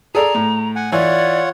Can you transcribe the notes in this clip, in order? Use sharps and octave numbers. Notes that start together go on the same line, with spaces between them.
G#4 A4 D5 A#5
A2
F#5 G#5
E3 F4 C#5 D5 F#5